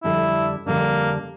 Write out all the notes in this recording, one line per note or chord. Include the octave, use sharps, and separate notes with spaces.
F2 D3 G3 D4 E4
F2 D3 G3 A#3 D4